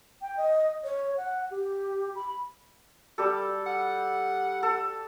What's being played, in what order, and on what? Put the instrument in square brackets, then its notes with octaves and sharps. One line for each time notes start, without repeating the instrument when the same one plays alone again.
[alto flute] G5
D#5
C#5
F#5
G4
B5
[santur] G3 G4 A4
[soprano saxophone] F#5
[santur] A4